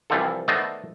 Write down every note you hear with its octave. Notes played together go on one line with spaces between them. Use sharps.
C2 E3 F3 G3 F4 A4
D#3 A3 B3 C5 D5 D#5